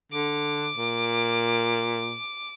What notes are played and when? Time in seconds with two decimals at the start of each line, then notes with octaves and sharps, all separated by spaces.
0.12 D3 D6
0.76 A#2